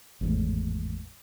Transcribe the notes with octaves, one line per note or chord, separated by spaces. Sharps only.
G#1 E2 A2